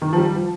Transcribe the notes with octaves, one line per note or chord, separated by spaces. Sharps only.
D#3
F3
G3
F3